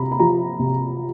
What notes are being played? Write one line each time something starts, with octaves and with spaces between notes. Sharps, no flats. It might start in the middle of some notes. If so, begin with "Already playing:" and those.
Already playing: C3 A#5 B5
B5
F3 A#5
C3